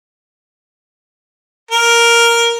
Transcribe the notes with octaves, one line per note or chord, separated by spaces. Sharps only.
A#4